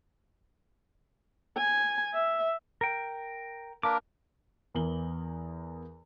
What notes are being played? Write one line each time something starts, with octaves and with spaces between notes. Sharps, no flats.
G#5
E5
A#4 G5
A#3 D4 A#4 B4 D6
E2 E3 A#4 F#7 G7